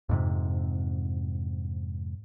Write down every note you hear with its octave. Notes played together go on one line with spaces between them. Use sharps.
F2 G#2 C3